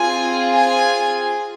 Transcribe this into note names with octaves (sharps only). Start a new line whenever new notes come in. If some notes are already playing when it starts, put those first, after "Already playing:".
Already playing: C4 F4 G#4 G#5
G#5